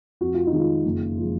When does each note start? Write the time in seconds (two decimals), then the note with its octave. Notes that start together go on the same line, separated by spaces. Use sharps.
0.21 F2 F#4
0.34 F4
0.47 D#4
0.53 D#3 G#3
0.60 F4
0.85 F#1
1.18 F3 G#3